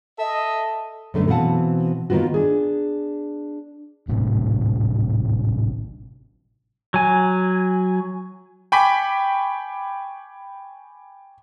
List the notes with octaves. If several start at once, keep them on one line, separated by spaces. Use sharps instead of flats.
A4 D#5 E5
F#2 D3 A3 B3
B2 E3 C4 F5 F#5 A5
D#3 A#3 B3 F4 F#4
D4 G#4
G#1 A2 C3
F#3 G#5
G5 G#5 B5 C#6 D6 B6